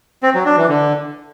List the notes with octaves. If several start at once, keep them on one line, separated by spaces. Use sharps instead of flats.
C4
F#3
D4
E3
D3